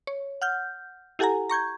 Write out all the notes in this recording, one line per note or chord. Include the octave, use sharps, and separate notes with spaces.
C#5
F#5 F6 G6
E4 G4 A4 F#5 G#5 A#5
A#5 C#6 G6 G#6